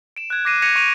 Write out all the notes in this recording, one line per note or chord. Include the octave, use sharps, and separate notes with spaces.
D7 E7
F#6 G#6
D6 F#6 A#6 C7 D#7
G#6 A#6 C#7 D#7 F7
C#6 D7 D#7 F7